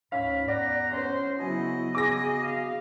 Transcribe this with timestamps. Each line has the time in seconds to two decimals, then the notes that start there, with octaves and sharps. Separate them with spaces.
0.12 D2 G#2 C#4 F5 B5
0.48 E2 G#2 D5 F#5 A#5
0.92 C#4 C5
1.40 C#3 F#3 B3 E4 F#4 D#5 G#5
1.95 G#4 D6 A#6
2.41 F5